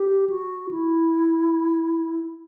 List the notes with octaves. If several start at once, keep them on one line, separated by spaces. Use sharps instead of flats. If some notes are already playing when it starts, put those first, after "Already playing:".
Already playing: G4
F#4
E4